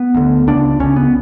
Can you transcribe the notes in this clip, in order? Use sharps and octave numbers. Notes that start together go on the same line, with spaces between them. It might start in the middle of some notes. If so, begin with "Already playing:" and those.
Already playing: B3
D2 D3
C#2 C#3 D4
C#2 C#3 C#4
B3